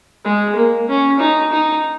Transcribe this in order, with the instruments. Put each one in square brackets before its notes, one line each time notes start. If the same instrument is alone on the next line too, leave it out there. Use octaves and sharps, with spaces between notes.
[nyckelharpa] G#3
A#3
C#4
D#4
D#4